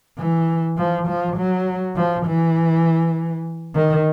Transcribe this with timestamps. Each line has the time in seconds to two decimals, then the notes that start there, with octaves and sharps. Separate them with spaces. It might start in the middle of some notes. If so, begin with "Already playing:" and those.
0.18 E3
0.78 F3
1.08 F3
1.37 F#3
1.96 F3
2.26 E3
3.75 D#3